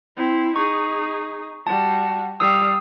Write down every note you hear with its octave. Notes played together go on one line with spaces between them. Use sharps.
C4 E4
D#4 G#4 C#6
G3 F#4 A5
G3 F5 D#6 E6